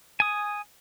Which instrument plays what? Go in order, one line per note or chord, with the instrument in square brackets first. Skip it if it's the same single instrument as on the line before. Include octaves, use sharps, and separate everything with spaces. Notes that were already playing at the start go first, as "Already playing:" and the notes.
[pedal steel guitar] G#5 D#6